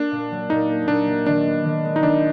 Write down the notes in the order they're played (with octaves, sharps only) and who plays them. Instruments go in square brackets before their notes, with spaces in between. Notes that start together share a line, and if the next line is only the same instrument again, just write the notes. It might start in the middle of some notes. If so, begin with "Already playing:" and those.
Already playing: [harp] A#3 [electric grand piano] D4
[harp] A#2
F#3
[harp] A#2 [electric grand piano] D#4
[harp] A#3
[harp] A#2 [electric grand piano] D4
[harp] F#3
[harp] D#3 [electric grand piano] D4
[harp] B3
D#3
G#3
[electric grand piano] D#4
[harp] D#3 [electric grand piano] D4